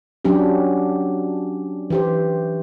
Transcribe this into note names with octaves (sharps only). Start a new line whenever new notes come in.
F#3 C#4 D4 G4
E3 G4 C5